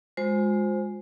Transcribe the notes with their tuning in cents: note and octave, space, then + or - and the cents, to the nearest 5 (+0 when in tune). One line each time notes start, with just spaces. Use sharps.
G#3 +0 F4 +40 C5 +0